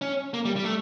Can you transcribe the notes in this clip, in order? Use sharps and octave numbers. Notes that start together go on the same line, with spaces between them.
C#4
A#3
G3
G3
A3